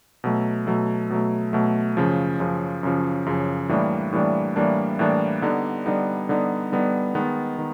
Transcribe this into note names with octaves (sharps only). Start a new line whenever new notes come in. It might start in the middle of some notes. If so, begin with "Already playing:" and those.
B2 F#3 A3
B2 F#3 A3
B2 F#3 A3
B2 F#3 A3
F#2 C#3 F3
F#2 C#3 F3
F#2 C#3 F3
F#2 C#3 F3
A2 E3 G3 A#3 D4
A2 E3 G3 A#3 D4
A2 E3 G3 A#3 D4
A2 E3 G3 A#3 D4
D3 G3 B3 D#4
D3 G3 B3 D#4
D3 G3 B3 D#4
D3 G3 B3 D#4
D#3 G#3 B3
D#3